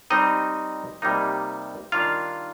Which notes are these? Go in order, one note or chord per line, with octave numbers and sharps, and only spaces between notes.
G3 C4 D#4 D#5
C3 G3 A#3 D#4
D#3 G3 D4 F4 F5